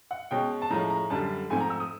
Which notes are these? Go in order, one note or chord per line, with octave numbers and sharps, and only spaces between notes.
F#5
B2 G#3 C#4 G5
A5
A2 F3 G#3 C#4 A#5
A#5
F#2 D3 G3 A5
G#2 F3 A3 C4 G#5
A#5
E6
D#6